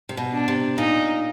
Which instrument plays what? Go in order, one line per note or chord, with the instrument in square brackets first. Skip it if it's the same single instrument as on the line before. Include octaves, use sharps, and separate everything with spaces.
[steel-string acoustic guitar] C3
B2
[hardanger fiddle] D4
[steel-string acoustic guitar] C3
[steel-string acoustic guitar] A#2 [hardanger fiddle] D#4